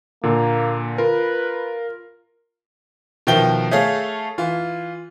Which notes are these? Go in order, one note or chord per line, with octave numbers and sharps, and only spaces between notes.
A#2 D3 A#3
F4 A#4 B4
B2 D#3 F3 E5 G5 G7
A3 G#4 A4 C#5 F5
E3 F4